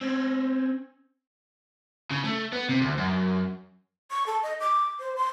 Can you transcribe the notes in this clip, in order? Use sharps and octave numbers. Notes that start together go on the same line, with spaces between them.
C4 C#4
C#3
A3
B3
C3
D2
F#2
C#6
A4
D#5
D6
C5
C6